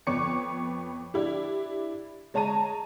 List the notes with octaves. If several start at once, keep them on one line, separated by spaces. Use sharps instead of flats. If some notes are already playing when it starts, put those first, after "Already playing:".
F2 B3 C#5 C#6 D6 C#7
D4 E4 G4
G#3 C#5 A5 A#5 D#7